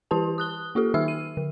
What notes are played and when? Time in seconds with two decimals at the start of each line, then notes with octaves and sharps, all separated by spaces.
0.11 E3 E4 G4 B4 A5
0.38 D#6 F#6 G7
0.75 A#3 F4 G4 A4
0.94 D#3 D#4 E5 E6 F6
1.08 D#7
1.37 D3